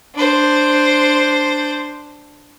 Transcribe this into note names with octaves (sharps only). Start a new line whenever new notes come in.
D4 C5